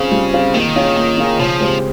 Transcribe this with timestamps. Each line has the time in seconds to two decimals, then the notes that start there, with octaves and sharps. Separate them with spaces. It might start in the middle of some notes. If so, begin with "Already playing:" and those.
Already playing: C#3 C4 F4 G#4
0.12 G3
0.33 C4 F4 G#4
0.54 D#3 A#3
0.75 C#4 F4 G#4
0.97 A#3
1.17 C#4 F4 G#4
1.39 C#3 F3
1.60 G#3 C4 G4